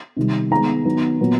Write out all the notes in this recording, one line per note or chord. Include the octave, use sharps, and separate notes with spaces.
C3 D#3 G3
D#3 G#3 B3 A#5
D#3 F#3 B3
A#2 F#3 B3